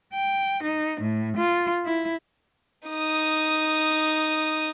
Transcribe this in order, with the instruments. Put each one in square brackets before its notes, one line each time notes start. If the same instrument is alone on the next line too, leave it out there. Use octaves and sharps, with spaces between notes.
[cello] G5
D#4
A2
F4
E4
[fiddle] D#4 D#6